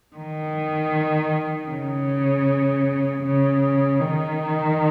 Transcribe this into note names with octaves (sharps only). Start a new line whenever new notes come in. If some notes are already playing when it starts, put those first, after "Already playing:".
D#3
C#3
C#3
D#3